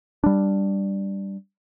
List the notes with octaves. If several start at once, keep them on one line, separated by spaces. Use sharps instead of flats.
G3 D4